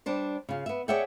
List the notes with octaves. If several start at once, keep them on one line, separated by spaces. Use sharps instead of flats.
G3 D4 C5
C#3 F4
B3 E5
G#4 C#5 D5 E5 F#5 G5